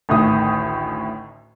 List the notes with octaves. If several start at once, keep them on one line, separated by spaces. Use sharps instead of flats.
A1 D2 A2 D#3 D#6